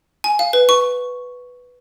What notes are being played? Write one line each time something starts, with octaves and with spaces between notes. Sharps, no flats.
G#5
F5
B4
C#6